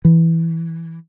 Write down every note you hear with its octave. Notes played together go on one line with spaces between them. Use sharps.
E3